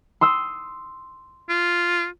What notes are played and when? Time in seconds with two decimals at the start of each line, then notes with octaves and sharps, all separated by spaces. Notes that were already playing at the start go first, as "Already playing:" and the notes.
0.21 C6 D#6 E6
1.49 F4